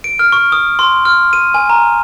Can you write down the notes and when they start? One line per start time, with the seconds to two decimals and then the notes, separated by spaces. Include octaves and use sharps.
0.04 D7
0.19 F6
0.32 C#6
0.52 D#6
0.79 C6
1.05 F6
1.33 D#7
1.54 G#5
1.70 A#5